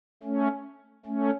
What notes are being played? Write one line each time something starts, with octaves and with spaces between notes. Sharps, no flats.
A3 C#4
A3 C#4